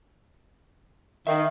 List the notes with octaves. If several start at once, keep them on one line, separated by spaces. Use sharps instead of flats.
D#3 E5 F5